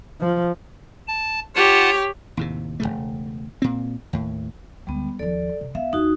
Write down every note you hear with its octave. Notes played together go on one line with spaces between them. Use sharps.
F3
A5
F4 G4 C#5 F#5 A5
D#2 A2 C3
E1 D#2 C#3 A3
A#2 C4
D#2 A2
D2 G3 G#3 B3
D#2 F3 A4 D5
C3
B3 E5 F5
D#2 D#4 F#4